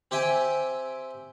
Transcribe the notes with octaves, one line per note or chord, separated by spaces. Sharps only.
C4 G4 E5 G5 G#5